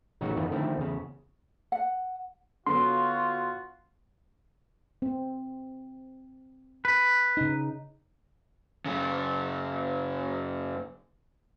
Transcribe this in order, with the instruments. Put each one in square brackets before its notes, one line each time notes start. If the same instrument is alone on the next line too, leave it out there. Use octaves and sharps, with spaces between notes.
[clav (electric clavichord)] A1 C#3 F#3 D#4 F#4 F#5
F2 D#3 E3 B3
D3 D#3 F3 A3 C4 E4
E2 C#3
[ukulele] F#5
[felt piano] D3 F#3 B3 [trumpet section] F4 F#4 [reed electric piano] C6
[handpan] C4
[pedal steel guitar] B4
[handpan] C#3 D#4
[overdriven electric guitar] F#2 C#3